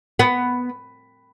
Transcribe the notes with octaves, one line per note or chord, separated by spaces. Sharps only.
B3